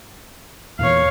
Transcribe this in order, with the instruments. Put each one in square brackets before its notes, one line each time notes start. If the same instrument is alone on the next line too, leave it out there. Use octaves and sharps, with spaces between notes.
[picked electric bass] E2 A#2 E3 [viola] C#5 F5